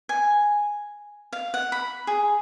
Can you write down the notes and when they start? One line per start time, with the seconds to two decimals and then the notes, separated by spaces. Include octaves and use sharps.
0.09 G#5
1.33 F5
1.54 F#5
1.72 B5
2.07 G#4